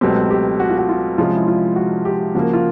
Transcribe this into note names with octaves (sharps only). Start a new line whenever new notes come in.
C#2 B2 F#3 A3 C4 G4
G4
F#4
F4
F#4
F4
C3 F3 G#3 C#4 F4
E4
F4
F#4
G4
C#3 F3 A#3 F#4
F4